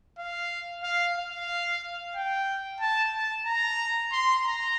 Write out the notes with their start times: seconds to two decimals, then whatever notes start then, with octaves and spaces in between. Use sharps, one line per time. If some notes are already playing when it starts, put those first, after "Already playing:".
0.19 F5
0.84 F5
1.17 F5
2.16 G5
2.81 A5
3.13 A5
3.46 A#5
4.12 C6
4.45 A#5